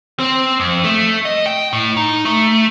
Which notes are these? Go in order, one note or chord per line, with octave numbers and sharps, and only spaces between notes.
C4
F2
A3
D#5
G5
A2
D#4
A3